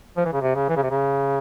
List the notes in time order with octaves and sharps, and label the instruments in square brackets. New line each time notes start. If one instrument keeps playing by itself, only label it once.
[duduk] F3
E3
C#3
C3
C#3
E3
C#3
C3
C#3